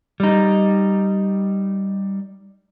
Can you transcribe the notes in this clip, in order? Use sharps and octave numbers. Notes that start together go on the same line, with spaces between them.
G3 D#4